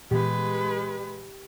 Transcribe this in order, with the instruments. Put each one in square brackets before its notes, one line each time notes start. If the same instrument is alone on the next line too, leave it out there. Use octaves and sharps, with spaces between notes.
[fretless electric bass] A#2 E3 B3 [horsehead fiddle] G#3 B4 [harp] G4